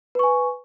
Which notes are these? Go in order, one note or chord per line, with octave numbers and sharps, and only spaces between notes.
B4 G#5 C#6